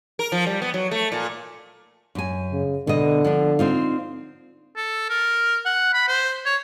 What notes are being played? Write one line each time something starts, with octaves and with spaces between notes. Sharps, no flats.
A#4
F3
G3
B3
F#3
A3
A#2
F#2 G#5
C#3
B2 D3 D#5
F3 D4
C4 D#4 F4
A4
A#4
F#5
B5
C5
C#5